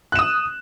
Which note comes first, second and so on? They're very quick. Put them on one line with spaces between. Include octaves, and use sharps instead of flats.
F#6 E7 D#6